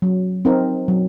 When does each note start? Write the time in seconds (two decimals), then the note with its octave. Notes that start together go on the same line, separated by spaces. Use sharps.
0.02 F#3
0.45 C4 D#4 A#4
0.88 F#3